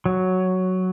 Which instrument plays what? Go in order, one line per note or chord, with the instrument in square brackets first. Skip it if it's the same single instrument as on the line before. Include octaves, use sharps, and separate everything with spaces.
[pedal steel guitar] F#3